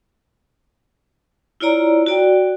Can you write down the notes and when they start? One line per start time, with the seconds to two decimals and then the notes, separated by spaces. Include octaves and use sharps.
1.60 E4 F4 C#5 D5 A#5
2.06 F#4 D5 G5